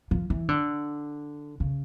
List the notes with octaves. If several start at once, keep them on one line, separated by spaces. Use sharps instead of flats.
F3
E3
D3
C#3